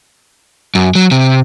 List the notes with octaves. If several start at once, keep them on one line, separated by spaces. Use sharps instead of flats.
F#2
F#3
C3